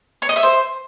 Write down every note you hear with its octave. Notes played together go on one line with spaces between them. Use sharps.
C#5
D#5
E5
C5